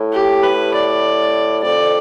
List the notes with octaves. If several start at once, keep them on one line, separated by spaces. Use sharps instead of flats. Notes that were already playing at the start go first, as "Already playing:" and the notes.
Already playing: A2
G4
B4
D5
F2 D5